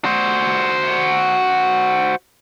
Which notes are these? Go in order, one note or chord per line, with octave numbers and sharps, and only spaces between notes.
F#4 C5